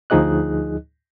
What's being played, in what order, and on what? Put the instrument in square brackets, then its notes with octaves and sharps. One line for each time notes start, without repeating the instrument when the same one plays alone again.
[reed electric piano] D2 F3 D#4 G#4 D#5 F#6